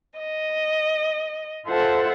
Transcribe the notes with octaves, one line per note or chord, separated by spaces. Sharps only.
D#5
F4 A4 C5 E5 F#5 A5